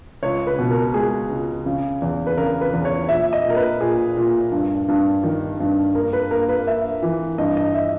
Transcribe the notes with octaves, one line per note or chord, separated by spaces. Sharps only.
C#2 C#5
B4
B2
A#4
G#3 G#4
C#2
C#3
E2
B4
C#3 A#4
B4
E2
C#5
A#2 E5
D#5
A#2
A#4
B4
A#2 G#4
A#2
G2
G2
D#3
G2
A#3 A#4
B4
A#3 A#4
B4
A#3 E5
E3
G2 D#5
D#5
E5